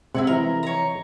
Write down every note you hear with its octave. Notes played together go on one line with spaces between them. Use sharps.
C3 G#3 C4 E4 G#4 F#5
E3 F3 A#4 D#5
C#5 A#5